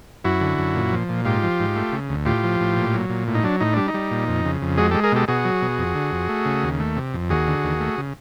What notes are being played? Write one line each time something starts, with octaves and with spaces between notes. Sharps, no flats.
F#2 E4 F#4
D3
F#2
A#2
F3
A#2
G#2 F4 G4
F3
G#2
A3
C#3
D2
A2 F4 G4
F3
A2
A#2
F#3
A#2
A2
D#4
F#3 D4
A2 D#4
G3 D4
D#4
G3
A#2
F2
C#3
F2
G#3 F#4 G#4
G#3 G4 A4
G#4 A#4
B2 G4 A4
B2 F#4 G#4
F#3
B2
F2
D3
F2
A3
C#3
D#2
A3
C3
F2
D#2 F#4 G#4
D3
D#2
A3
C#3